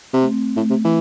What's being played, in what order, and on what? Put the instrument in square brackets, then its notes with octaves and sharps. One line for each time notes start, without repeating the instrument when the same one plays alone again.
[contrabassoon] C3
[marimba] A3
C4
[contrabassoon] A2 [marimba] A3
[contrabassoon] C3
E3